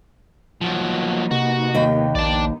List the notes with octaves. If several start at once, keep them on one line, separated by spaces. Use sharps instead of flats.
F3 F#3 A#3 B3 D#4
C3 F#4
D#2 G5
A#1 D5 A5